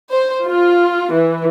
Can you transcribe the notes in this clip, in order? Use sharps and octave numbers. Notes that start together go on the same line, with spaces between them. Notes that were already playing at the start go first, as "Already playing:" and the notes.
C5
F4
E3